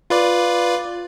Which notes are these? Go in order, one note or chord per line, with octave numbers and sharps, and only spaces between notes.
F4 B4 D5